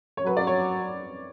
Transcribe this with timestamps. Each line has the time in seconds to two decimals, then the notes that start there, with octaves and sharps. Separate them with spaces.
0.17 C#5
0.26 F#3 B4
0.37 D5
0.47 C#5